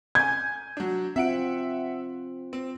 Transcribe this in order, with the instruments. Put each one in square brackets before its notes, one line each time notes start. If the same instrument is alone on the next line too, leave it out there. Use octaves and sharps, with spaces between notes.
[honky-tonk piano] G#5 G6 [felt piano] G#6
[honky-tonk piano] F#3 D4
[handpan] C4 F4 [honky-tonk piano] E5 F#5 D7
[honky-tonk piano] C4